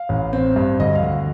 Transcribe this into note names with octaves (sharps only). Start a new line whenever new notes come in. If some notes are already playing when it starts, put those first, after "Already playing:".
Already playing: F5
A1
C4
G2
D2 D#5
F5
D2